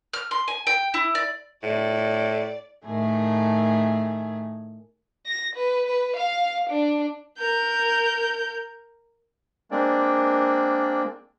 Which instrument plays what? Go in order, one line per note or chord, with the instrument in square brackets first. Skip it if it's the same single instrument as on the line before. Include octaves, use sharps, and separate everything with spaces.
[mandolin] F6
C6
G#5
G5
E4
D5
[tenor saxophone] A2 [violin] D5
[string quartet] A2 D#3 A3 G#4
[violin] A#6
B4
B4
F5
D4
A#4 G6
[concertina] G#3 A#3 C4 D4 D5